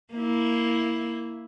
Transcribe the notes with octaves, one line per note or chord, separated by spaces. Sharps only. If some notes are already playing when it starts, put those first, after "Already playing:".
A#3 E4